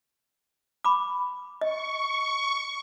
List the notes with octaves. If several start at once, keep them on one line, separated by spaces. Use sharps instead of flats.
B5 D6
D#5 C#6